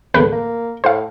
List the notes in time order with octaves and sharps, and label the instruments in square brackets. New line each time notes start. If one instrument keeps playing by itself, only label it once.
[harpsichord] E2 A2 D3 [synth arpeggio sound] B4
[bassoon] A#3
[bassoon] A2 [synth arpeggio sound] C5 F5